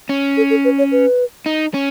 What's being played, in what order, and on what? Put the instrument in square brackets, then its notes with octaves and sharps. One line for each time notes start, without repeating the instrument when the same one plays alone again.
[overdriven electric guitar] C#4
[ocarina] A4
A4
B4
C#5
B4
[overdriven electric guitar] D#4
C#4